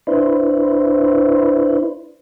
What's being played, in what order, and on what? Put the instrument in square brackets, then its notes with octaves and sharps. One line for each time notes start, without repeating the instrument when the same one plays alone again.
[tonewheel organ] D4 E4 B4 C5